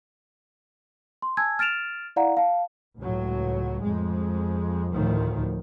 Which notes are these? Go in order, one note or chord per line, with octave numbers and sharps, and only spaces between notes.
C6
G#5 A5 E6 G#6
F6 A6 D7 E7 F7
E4 D5 F5 F#5 A#5
F5 A5
C#2 A2 F#3
F2 G#3
D2 A2 D#3 F3